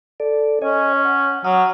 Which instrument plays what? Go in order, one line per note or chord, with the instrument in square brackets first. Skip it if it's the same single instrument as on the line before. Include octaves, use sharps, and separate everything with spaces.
[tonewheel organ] A4 D5
[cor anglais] C#4 [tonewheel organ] C#5 D#5 G#5
[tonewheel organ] F#5
[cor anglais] F#3 [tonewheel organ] F#5 D#6 F6